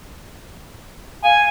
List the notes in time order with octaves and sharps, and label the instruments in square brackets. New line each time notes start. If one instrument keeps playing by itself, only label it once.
[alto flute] F5 [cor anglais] G#5